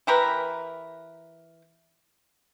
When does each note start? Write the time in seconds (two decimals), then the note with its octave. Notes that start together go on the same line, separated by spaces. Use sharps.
0.07 E3 G4 A#4 B4